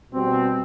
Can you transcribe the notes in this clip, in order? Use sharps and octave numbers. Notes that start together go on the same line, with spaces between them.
B2 G3 C4